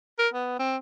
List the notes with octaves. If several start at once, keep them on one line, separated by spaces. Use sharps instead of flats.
A#4
B3
C4